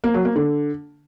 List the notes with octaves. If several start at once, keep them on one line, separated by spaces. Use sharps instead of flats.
A#3
F#3
A#3
D3